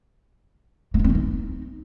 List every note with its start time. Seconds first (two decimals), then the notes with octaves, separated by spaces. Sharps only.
0.94 A#3
0.99 A3
1.04 C4
1.10 A#3
1.15 D#4